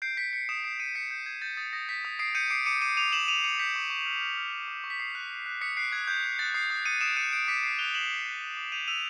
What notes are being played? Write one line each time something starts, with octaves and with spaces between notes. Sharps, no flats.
G6 C7 D7
G6 B6 C#7
G6 B6 C#7
D#6 D7 E7
D#6 C7 D7
D#6 C#7 D#7
G6 B6 C#7
G6
G6 G#6
G6 A6
D#6 A6
D#6 A#6
G6 B6
D#6
D#6 C7 D7
G6 C#7 D#7
D6 C7 D7
D6 C#7 D#7
D6 C#7 D#7
D6 D#7 F7
D6 E7 F#7
D6 D#7 F7
D6 C#7 D#7
G6 B6 C#7
C#6
C#6
F6
F6
F6
F6
C#6
C#6
B6
D#6 C7
F#6
F#6
F#6
D#6 B6 C#7
F#6 C7 D7
F#6 G#6
D#6 G6
F#6
F#6 A6
D#6 C7
D#6
D#6 C#7 D#7
D#6 D7 E7
F#6 C#7 D#7
F#6 C7 D7
D6 B6 C#7
F#6 C7 D7
F#6 F7 G7
F#6 E7 F#7
D6
F#6
F#6
D6
G6 D#7 F7
E6 D#7 F7